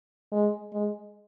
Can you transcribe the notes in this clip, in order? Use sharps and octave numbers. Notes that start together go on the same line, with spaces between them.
G#3
G#3